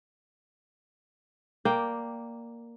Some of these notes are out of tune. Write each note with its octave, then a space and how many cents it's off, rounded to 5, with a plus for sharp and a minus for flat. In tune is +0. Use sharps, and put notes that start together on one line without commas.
A#3 +0 D5 +0 G5 +0